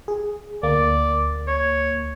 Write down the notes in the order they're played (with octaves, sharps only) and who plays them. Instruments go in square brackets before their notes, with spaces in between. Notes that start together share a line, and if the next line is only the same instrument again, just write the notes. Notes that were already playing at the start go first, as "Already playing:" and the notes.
[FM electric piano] G#4
[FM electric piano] D2 A#3 [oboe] D5
[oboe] C#5